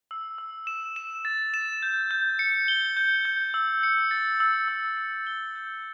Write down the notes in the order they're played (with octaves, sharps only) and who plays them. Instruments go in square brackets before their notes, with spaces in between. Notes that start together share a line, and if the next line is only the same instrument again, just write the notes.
[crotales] E6
E6
E7
E7
A6
E7
G6
G6
C#7
G7
G6
G6
E6
C#7
A6
E6
E6
C#7
G7
G6